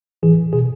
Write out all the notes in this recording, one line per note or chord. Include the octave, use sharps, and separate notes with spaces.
A2 E3 G#4
B2 G#4